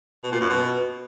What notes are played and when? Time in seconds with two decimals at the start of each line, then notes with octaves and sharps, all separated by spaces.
0.23 B2
0.32 A#2
0.41 F#2
0.49 B2